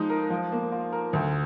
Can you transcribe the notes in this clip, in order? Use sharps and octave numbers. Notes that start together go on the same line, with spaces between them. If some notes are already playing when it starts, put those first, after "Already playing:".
Already playing: F3 G#3 D#4
A#4
F3
A#3
F4
A#4
D2